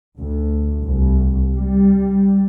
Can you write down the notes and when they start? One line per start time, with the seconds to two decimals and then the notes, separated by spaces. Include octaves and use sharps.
0.19 D2
0.83 C2
1.54 G3